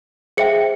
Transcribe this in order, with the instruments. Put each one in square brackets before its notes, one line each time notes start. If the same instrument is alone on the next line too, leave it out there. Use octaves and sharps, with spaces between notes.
[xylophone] G#4 C5 E5 G5 C#7